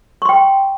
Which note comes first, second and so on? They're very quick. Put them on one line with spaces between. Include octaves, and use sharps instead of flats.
C#6 C6 G5